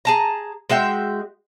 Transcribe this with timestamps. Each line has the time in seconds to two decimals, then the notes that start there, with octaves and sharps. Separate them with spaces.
0.05 G#4 A5 A#5
0.70 G#3 F#4 E5 G5